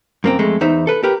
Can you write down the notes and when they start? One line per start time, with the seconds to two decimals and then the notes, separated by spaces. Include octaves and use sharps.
0.24 F#2 A#3 C4
0.39 F2 G#3 A3
0.61 E2 D#4 C5 E5
0.87 A4 B4
1.03 G4 A#4 B4